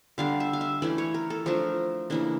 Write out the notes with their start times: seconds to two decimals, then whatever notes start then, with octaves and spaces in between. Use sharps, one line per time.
0.18 D3 G3 D4 F5
0.40 E5
0.53 F5
0.61 E5
0.82 E3 A3 C#4 D5
0.98 C#5
1.14 A#4
1.30 A4
1.46 F3 A3 D4 A#4
2.10 C#3 E3 A#3 D4